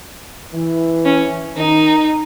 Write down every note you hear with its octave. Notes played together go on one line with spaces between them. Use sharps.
E3
C#4
D#3 D#4